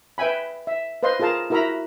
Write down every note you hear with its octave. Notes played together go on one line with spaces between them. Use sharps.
B4 E5 G5 G#5 B5
E5
B4 C5 D#5 F5 C6
F4 G#4 A#4 F5 A5 A#5
E4 F#4 A#4 E5 A#5 B5